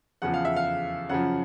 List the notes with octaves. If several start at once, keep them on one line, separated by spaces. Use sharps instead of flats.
E2 C#3 F3 F#5
F5
E5
F5
F#2 C#3 F3 F#5